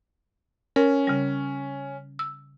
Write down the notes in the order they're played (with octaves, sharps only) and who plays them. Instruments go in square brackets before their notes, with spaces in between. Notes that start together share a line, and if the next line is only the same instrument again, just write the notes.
[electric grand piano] C#4 [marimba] A#4
[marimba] C#3 G3
E6